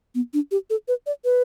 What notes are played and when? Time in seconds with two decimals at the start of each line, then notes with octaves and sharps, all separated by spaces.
0.15 B3
0.34 D4
0.51 G4
0.70 A4
0.88 B4
1.06 D5
1.25 B4